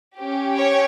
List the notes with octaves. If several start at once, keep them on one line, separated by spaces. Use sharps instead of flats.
C#4 G4
C#5